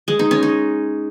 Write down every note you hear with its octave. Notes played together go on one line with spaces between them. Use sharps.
G#3
D#4
C#4
D#4